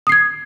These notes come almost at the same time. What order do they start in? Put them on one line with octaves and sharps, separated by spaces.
D#6 C7 G#6